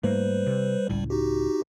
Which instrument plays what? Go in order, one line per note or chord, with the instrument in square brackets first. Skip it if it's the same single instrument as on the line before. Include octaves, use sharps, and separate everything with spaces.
[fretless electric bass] G#2 A3 A#3 [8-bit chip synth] G3 B4 C5
[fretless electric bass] C3
[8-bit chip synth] G#1 G3 [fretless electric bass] C#2 A2
[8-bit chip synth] D#4 F#4 G4